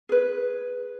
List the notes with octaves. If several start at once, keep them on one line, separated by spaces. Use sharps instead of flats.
G#4 B4